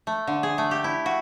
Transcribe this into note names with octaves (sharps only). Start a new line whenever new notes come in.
A3
D3
G#4
A3
G4
E4
F#4